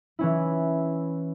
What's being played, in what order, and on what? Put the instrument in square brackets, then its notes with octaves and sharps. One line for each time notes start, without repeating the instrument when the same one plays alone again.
[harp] E3 C#4 E4